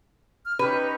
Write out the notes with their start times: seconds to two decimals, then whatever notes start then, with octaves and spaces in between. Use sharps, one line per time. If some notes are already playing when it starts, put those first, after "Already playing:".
0.45 F6
0.59 C#4 D#4 G4 B4